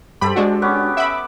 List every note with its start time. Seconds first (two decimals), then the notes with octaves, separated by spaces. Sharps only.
0.21 G2 G4 A4 C5 B5
0.36 G#3 D4 F#4
0.62 B3 C#4 D6
0.97 E5 F#5 B5 D6 E6